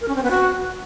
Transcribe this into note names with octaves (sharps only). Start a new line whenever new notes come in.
A#4
C#4
C4
B3
F#4